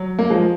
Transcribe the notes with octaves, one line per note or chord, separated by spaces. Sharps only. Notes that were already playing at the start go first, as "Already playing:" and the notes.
Already playing: F#3
A#3
F3 G#3